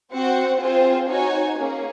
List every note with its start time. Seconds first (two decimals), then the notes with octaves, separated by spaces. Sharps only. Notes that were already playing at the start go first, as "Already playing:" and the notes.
0.12 C4 F#4 C5 F#5
0.60 C4 F4 G#4 C5
1.09 D#4 F#4 C#5 G#5
1.57 A#3 C#4 G#4